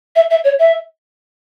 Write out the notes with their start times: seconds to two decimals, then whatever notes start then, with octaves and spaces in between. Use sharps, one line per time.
0.16 E5
0.30 E5
0.44 C#5
0.59 E5